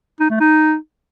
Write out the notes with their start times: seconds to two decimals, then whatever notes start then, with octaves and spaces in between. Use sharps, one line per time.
0.20 D#4
0.30 A3
0.40 D#4